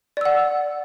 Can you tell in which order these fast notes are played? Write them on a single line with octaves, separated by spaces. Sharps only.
D5 E6 F#5